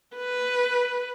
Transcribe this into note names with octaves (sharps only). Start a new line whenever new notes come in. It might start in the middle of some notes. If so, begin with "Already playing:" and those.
B4